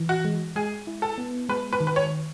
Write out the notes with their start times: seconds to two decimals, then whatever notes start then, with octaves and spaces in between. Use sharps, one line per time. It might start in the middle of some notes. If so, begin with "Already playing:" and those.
Already playing: E3
0.09 F#4
0.25 G#3
0.56 G#3 G#4
0.87 E4
1.02 A4
1.18 B3
1.49 G#3 B4
1.73 B4
1.81 D#3
1.87 B4
1.96 C#5